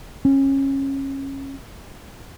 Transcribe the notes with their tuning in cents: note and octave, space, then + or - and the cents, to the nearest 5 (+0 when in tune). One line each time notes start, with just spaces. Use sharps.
C#4 -25